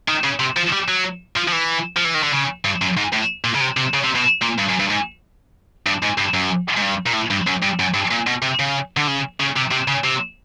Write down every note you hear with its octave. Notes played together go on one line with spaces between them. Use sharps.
D#3
C#3
C3
F3
G3
F#3
F3
F3
E3
F3
E3
D#3
D3
C#3
G2
F#2
G#2
A2
A#2
C#3
C3
C3
C#3
C3
B2
A#2
G2
F#2
G2
G#2
G2
G#2
G2
F#2
G#2
G2
A#2
A2
G2
F#2
G2
F#2
G2
A#2
B2
C3
C#3
D3
C#3
C#3
C3
C3
C#3
C3